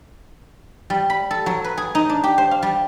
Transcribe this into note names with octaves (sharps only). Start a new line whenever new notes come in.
G3
B5
A4
F#3
B4
G#4
D#4
D4
G4
C5
F5
G3